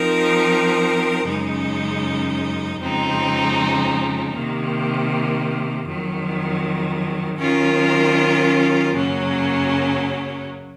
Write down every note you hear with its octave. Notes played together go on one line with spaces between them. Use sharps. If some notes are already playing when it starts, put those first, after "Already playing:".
Already playing: F3 C4 D#4 A#4
F#2 C#3 G#3 D#4
F2 C#3 G#3 C4 D#4
C3 D#3 A#3
F2 D#3 F#3
D#3 F#3 C#4 F4 A#4
F#2 C#3 F#3 A#3 C#4